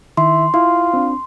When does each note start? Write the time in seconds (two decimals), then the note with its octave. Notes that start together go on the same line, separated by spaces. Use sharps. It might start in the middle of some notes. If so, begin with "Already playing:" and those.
0.17 D#3 E4 C6
0.54 E4 F4 C6
0.94 C4 D4